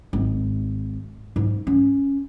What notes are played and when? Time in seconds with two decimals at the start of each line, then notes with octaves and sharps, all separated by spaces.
0.13 G#1
1.36 G#2
1.67 C#4